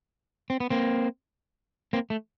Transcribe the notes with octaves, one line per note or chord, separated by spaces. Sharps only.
C4
B3
A#3 C4
A#3 C4
A3